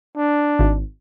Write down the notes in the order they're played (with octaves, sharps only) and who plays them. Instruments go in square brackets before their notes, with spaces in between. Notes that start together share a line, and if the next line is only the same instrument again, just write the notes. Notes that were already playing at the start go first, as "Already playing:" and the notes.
[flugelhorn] D4
[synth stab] G#1